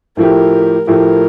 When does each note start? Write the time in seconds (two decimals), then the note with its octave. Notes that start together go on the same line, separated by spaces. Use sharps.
0.17 A2 F3 A3 E4 G4 A#4
0.87 A2 F3 A3 E4 G4 A#4